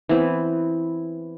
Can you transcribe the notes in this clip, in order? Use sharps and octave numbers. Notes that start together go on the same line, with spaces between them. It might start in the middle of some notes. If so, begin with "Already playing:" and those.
E3 B3 C4